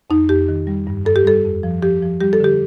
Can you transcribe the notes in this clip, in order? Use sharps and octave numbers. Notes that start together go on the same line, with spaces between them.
F2 D#4
F2 G4
D#3
G3
G2
G2 A4
G4
G3 A4
F2
F3
F3 G4
F3
G3 G4
A4
D3 G4